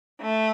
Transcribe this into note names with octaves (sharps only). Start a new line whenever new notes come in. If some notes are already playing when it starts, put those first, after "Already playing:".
A3